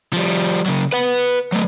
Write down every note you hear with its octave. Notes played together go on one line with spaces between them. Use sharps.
F3 G3
C#3 F#3
B4 F#5
F#3 A3